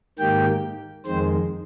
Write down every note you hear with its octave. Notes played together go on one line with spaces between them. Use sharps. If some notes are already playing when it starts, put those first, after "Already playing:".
G#2 D#3 A#3 G4 G5
F2 D#3 G#3 C4 C5